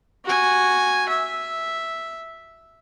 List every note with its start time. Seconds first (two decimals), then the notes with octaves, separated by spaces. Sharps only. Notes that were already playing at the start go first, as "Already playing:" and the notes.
0.25 F#4 G#5
1.09 E5